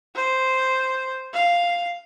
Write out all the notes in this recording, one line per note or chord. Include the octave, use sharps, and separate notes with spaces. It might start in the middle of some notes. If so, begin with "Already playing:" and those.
C5
F5